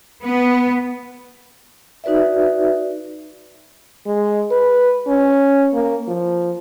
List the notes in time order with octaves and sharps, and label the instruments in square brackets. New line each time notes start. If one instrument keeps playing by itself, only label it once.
[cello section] B3
[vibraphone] D#4 F#4 B4 D5 E5
[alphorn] G#3
B4
C#4
A#3
F3